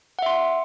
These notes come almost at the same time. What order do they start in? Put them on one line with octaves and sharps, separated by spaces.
F#5 E5 C6